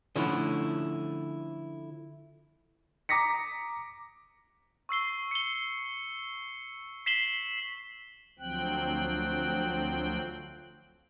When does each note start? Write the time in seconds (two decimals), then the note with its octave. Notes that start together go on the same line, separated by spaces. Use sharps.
0.16 D3 F3 A3 C#4 E4
3.09 A#5 D6 D#6 A#6 B6 C#7
4.89 C#6 E6 C7 G7
5.31 C#7 G7
7.06 B6 C7 E7 F#7 G7
8.39 D2 F3 F#3 C4 G5 F#6